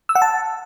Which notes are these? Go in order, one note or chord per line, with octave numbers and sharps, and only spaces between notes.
E6
F#5
A5